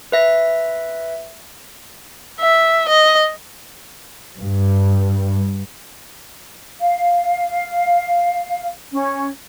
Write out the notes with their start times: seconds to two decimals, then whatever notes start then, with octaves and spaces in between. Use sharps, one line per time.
0.12 B4 E5 A#6
2.40 E5
2.89 D#5
4.38 G2
6.80 F5
8.92 C#4